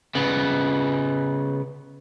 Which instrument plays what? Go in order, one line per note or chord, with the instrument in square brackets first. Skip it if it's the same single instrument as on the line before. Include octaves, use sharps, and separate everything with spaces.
[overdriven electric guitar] C#3 B3